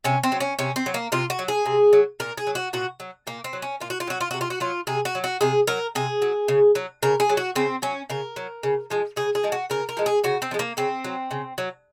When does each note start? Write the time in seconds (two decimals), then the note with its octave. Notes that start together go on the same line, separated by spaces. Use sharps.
0.04 C3 C#4
0.23 C4
0.32 F#3
0.40 C#4
0.59 C3 C#4
0.76 C4
0.86 F#3
0.94 A#3
1.12 C3 F4
1.30 F#4
1.39 F#3
1.48 G#4
1.66 C3
1.93 F#3
2.20 A#2 A#4
2.37 G#4
2.47 F#3
2.55 F#4
2.73 A#2 F#4
3.00 F#3
3.27 A#2 A#3
3.44 C4
3.53 F#3
3.62 C#4
3.80 A#2 F4
3.90 F#4
4.00 F4
4.07 F#3 F#4
4.21 F4
4.31 C3 F#4
4.41 F4
4.50 F#4
4.60 F#3 F4
4.87 C3 G#4
5.05 F#4
5.15 F#3
5.24 F#4
5.41 C3 G#4
5.67 F#3 A#4
5.95 C3 G#4
6.22 F#3
6.48 C#3
6.75 F#3
7.03 C#3 A#4
7.20 G#4
7.29 F#3
7.37 F#4
7.55 C#3 C4
7.82 F#3 C#4
8.10 C#3 A#4
8.36 F#3
8.63 C#3
8.90 F3 G#3
9.16 C#3 G#4
9.35 G#4
9.43 F3 G#3
9.52 F#4
9.70 C#3 A#4
9.89 A#4
9.97 F3 G#3
10.06 G#4
10.24 C#3 F#4
10.42 C4
10.51 F3 G#3
10.59 A#3
10.77 C#3 C4
11.04 F#3
11.31 C#3
11.58 F#3